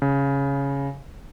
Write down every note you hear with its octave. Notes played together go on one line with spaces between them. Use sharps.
C#3